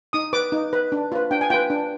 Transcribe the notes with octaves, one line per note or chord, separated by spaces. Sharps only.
D#4 D#6
B4 D6
D#4
B4
D4
F4 B4
D4 G5
G#5
F4 B4 G5
D4